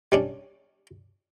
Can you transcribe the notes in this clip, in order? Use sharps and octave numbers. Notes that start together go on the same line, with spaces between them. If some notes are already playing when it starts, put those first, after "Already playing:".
G3 C#4 D4